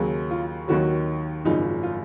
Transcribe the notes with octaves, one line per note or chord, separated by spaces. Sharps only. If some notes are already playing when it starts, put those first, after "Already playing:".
Already playing: D#2 C#3 F#3
F4
D#2 D#3 F#3 F#4
G#1 F#2 C#3 F3 D#4
F4